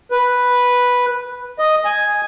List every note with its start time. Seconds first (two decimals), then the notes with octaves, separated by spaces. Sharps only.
0.11 B4
1.59 D#5
1.85 G#5